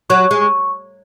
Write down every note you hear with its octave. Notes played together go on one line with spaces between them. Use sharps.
F#3 C#6
G#3
C#6